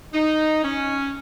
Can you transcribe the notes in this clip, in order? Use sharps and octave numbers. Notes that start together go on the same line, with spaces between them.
D#4
C#4